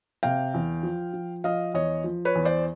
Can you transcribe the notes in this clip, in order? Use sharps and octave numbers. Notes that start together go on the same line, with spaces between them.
C3 F5 G5
E2
F3
F3
F3 D#5 F5
E2 C#5 D#5
F3
B4 C#5
E2
C5 D5